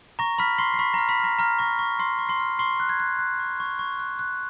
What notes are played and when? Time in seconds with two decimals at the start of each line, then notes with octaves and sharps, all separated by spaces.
0.19 A#5 C#6 A#6
0.38 B5 F6 B6
0.58 C6 C#6 C7
0.74 C7
0.79 B5 C#6 B6
0.94 A#5 A#6
0.99 F6
1.09 B5 B6
1.20 A#5 F6 A#6
1.39 A#5 F6 A#6
1.59 A#5 C#6 A#6
1.79 C#6
1.99 C6 F6 C7
2.19 C#6
2.29 C6 C7
2.40 F6
2.59 C6 C#6 C7
2.80 F#6
2.89 G#6
3.00 F#6
3.19 F#6
3.40 C#6
3.60 C#6
3.79 C#6
3.99 F#6
4.19 F#6